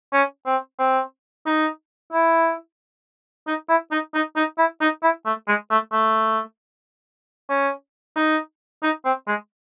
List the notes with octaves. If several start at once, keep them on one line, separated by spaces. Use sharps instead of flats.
C#4
C4
C4
D#4
E4
D#4
E4
D#4
D#4
D#4
E4
D#4
E4
A3
G#3
A3
A3
C#4
D#4
D#4
C4
G#3